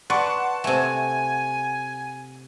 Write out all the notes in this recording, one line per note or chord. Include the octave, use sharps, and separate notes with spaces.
B4 D5 F#5 A5 C6 C#6
C3 A3 G#5